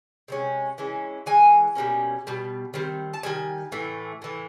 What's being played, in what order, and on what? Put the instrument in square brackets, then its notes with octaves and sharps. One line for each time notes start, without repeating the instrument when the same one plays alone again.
[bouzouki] C3 D#3 G#3 C#4
E3 G#3 C#4
E3 G#3 G#5
B2 G3 A#3 C#4
B2 G3
D#3 G3 C4
A5
D#3 G3 G#5
A2 E3 A3
A2 E3 A3